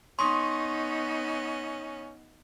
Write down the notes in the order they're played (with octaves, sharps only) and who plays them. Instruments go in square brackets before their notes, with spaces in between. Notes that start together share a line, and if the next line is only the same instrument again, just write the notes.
[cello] B3 D#4 [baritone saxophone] C#4 [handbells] C6 D#6 [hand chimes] C#6